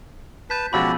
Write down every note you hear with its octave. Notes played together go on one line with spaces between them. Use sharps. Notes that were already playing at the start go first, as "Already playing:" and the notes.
B4 A5 G6 B6
C#2 B2 F3 F#4 G4 B5 E6 A6